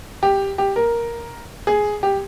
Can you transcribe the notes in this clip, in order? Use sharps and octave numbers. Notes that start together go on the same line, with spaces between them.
G4
G4
A#4
G#4
G4